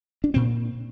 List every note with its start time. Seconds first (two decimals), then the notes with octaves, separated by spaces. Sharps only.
0.24 D4
0.34 A#2 C4